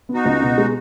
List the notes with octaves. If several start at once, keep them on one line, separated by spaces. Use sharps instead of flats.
B3
D#4 F#4
C#2
B2
G#3